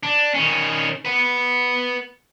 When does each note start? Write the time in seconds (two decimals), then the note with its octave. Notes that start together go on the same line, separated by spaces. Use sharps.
0.03 D4
0.34 D#3 C#4
1.05 B4 F#5